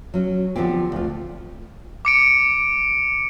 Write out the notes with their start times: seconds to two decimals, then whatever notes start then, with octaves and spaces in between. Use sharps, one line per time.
0.14 F#3 C#4
0.56 D3 F3 B3 C4 G4
0.92 D2 F4
2.05 D6 C#7 D7